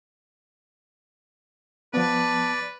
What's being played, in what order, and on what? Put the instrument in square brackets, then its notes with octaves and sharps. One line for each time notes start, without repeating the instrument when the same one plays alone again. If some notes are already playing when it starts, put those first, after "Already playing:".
[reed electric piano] F3 B3 [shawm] B4 [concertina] D5 [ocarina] A5